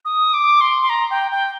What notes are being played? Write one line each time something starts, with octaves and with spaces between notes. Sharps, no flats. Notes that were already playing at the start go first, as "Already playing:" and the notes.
D#6
D6
C6
C6
A#5
G5
G5